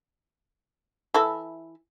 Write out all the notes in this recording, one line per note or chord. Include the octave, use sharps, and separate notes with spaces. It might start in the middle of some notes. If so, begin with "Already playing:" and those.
E3 E4 A4